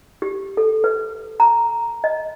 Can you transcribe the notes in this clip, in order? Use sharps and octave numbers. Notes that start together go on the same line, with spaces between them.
G4
A4
B4
A#5
D#5